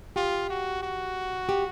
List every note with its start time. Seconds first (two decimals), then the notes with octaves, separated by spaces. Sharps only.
0.16 F4 G4
0.50 F#4
0.82 F#4
1.49 G4